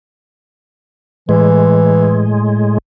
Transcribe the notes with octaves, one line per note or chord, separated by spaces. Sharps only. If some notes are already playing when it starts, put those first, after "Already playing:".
A2 E3 G#3